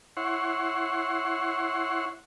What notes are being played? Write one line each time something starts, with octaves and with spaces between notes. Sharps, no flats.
E4 C#5 F#5 C6